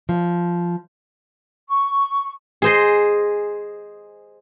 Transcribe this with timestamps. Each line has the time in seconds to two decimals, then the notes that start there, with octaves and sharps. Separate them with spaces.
0.09 F3
1.68 C#6
2.62 G#4 C5 D#5